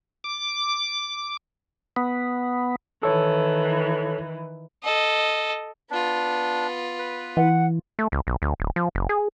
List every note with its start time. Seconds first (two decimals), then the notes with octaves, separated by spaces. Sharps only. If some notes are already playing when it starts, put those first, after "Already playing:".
0.24 D6
1.96 B3
3.03 D#3 E3 A4 C#5
4.83 A4 D#5
5.90 B3 D4 F4
6.99 B4
7.37 E3 F#5
7.99 A3
8.12 C#2
8.27 B1
8.42 D2
8.60 D1
8.76 F3
8.95 F#1
9.09 G#4